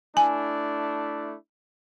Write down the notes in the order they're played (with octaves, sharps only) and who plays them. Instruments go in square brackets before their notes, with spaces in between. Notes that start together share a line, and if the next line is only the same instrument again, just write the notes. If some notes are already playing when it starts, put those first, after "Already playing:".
[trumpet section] A3 D4 E4 [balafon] G#5